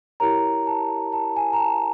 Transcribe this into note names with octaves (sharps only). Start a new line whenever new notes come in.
E4 G4 A#4 C#5 A#5
A5
A5
G#5
A#5
A5